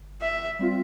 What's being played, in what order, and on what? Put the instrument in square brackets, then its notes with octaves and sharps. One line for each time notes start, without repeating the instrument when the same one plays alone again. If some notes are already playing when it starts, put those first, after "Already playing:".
Already playing: [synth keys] G1
[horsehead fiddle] E5
[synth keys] G3 C4 F4